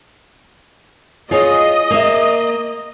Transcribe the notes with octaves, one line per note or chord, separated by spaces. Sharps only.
F4 G#4 C#5 D#5
A#3 E5